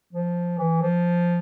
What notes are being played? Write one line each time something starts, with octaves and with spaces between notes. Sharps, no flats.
F3
E3
F3